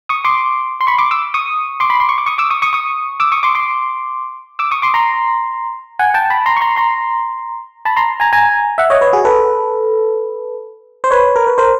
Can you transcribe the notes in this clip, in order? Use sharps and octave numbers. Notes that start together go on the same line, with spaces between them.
C#6 D#6
C6 D6
C6
B5 C#6
C6 D6
D6 E6
C#6 D#6
C6 D6
B5
C6
C#6
D6
C#6 D#6
D6 E6
C#6 D#6
C#6 D#6
C#6 D#6
D6 E6
C#6 D#6
C6 D6
C6 D6
D6 E6
C#6 D#6
C6 D6
A#5 C6
F#5 G#5
G5 A5
A5 B5
A#5 C6
C#6
A#5 C6
A#5 C6
A5 B5
A#5 C6
G#5 A#5
G#5 A#5
E5 F#5
C#5 D#5
B4 C#5
F#4 G#4
A4 B4
C5
B4 C#5
A#4
B4
A#4 C5